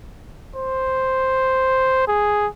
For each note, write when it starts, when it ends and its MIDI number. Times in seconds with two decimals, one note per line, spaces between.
0.56 2.07 72
2.08 2.47 68